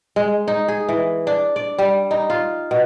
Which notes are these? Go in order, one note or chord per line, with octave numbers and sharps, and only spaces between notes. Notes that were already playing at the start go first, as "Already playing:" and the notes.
G#3
D#4
G#4
E3
D4
D5
G3
D#4
F4
B2